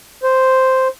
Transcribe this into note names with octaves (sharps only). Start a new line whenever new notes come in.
C5